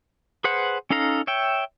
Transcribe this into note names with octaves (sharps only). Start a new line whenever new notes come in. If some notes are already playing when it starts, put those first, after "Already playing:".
G#4 B4 C5 F#5
C#4 D#4 A4 F5 A#5
C#5 E5 G5